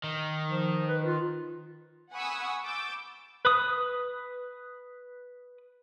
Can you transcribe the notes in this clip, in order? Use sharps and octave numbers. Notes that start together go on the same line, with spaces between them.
D#3
F3
B4
F4
F#5 G#5 B5 C#6 D#6 E6
D6 E6 G6 A6
B4 D#6